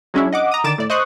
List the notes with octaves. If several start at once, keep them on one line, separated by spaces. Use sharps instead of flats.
F#3 G#3 C#4 D4 E4
D#5 F#5 D6
A#5 D#6
D3 D#3 D6 A6 E7
A2 D5
C5 D#5 C#6 D#6 F#6